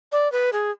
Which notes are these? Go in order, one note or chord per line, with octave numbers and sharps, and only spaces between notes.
D5
B4
G#4